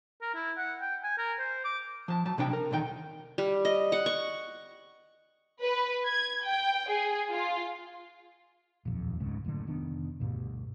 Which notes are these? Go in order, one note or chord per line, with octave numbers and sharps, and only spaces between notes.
A#4
E4
F#5
G5
G#5
A#4
C5
D6
F3 A5
F#3 A5
C3 D4 G5
A#4
B1 E2 D#3 G5
G3
D#5
F#5
C#6
B4
G#6
G5
G#4
F4
D#1 B1 F2
C#2 G#2 C#3
F#1 F#2 A2 D3
F1 D#3 B3 D4
D2 G2 B2